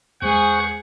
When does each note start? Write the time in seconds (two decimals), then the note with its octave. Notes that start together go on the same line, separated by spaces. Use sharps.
0.22 E2 G#3 G#4 C5 F#5 C#6 G6